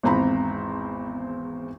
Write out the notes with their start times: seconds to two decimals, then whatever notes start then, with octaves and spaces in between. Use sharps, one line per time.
0.03 G#1 E2 C4 A#5 B5